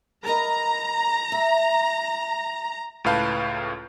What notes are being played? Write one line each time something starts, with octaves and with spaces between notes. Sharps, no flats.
A#4 B4 D#5 A#5
E5
C#2 A2 B4 F5 A5 G6